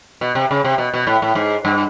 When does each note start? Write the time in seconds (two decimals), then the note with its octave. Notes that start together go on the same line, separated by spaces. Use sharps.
0.21 B2
0.35 C3
0.51 C#3
0.65 C3
0.78 B2
0.94 B2
1.07 A2
1.22 A2
1.35 G#2
1.65 G2